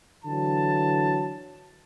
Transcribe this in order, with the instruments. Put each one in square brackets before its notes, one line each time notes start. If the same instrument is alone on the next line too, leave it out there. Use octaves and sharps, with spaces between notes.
[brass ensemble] D3 E3 F#3 A5